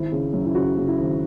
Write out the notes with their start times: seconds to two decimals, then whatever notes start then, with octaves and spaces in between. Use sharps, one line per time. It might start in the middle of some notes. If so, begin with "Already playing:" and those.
Already playing: G#1 E4
0.12 C#3
0.33 F#2
0.46 E4
0.55 C#3 F#4
0.78 C#3
0.88 E4
0.98 G#1